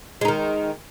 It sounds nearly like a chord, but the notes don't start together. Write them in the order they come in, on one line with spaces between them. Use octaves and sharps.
G#3 D#4 D#3